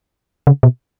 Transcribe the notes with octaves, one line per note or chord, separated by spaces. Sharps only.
C#3
B2